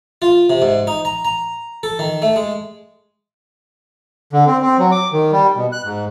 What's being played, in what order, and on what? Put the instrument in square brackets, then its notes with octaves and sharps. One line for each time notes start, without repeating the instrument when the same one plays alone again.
[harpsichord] F4
C3
G#2
D#4
A#5
A#5
A4
D#3
A3
G#3
[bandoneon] D3
C4
C4
F#3
D6
D#3
G3
B2
F#6
G#2